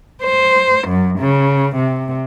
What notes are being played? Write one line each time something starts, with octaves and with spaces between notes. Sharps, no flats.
C5
F#2
C#3
C3